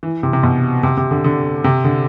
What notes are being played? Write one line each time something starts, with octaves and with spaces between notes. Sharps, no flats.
E3
C3
C3
B2
C3
C3
D3
D3
C3
D3